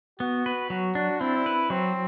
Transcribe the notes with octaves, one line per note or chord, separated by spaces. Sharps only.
B3 F#4
B4
F#3 F#4
D4
C4 E4
B4
F#3 C4